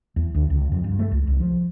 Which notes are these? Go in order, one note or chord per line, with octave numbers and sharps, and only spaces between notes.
E2
D2
C#2
F2
G2
A3
C#2
C2
F3